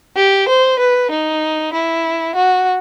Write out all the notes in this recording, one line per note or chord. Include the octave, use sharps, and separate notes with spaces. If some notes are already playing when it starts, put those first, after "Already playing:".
G4
C5
B4
D#4
E4
F#4